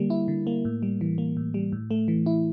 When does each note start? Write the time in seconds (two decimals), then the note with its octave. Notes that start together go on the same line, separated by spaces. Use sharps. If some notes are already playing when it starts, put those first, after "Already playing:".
Already playing: D3 G3 A#3
0.10 E4
0.28 D3
0.47 A#3
0.65 A2
0.83 G3
1.01 E3
1.18 A#3
1.37 A2
1.54 G3
1.72 A2
1.91 A3
2.08 E3
2.26 E4